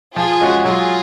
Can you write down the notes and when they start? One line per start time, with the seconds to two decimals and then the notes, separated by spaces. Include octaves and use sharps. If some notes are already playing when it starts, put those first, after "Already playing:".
0.16 F3 F4 G#4
0.41 G#3 C#4 F#4
0.65 F#3 F4 G#4